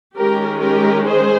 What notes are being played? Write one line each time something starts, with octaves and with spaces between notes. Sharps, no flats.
D#3 G#3 C#4 G4 A#4
G4 A#4
G#4 C5